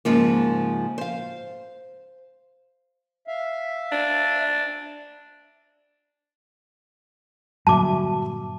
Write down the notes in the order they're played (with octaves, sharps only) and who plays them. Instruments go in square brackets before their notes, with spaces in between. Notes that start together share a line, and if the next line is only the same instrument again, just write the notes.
[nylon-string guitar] G#2 C#3 F3 A#3
C5 F5
[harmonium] E5 F5
[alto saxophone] D4
[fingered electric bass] G2 A#2 D3 [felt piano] F#3 E5 [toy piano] A5 D6